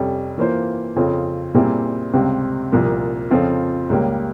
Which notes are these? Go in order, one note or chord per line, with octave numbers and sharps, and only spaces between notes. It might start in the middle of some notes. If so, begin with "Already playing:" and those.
Already playing: F2 C3 G3 C#4
E3 A#3 F4 C5
F2 C#3 F3 C4 F4
A#2 G3 C4 E4 G#4
C#2 C3 G3 C4
C2 A#2 F3 A#3
F2 C#3 F3 C4 F4
C#2 C#3 G3 A#3